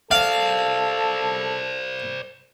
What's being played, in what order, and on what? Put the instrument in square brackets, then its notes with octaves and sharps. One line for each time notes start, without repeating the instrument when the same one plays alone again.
[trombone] A4 [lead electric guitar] C5 D5 [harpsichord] F5